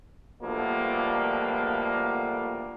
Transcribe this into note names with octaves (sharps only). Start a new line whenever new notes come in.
B2 D3 F3 G3 A3 A#3